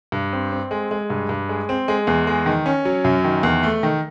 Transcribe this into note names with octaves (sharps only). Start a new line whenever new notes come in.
G2
C4
C4
G#3
G#3
G2
G2
G#3
C4
G#3
E2
G#3
D#3
C#4
F#3
F#2
D#3
E2
A3
D#3